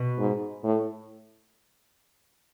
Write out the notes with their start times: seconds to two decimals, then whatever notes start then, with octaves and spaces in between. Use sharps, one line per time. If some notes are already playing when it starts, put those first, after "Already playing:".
Already playing: B2
0.19 G#2
0.64 A2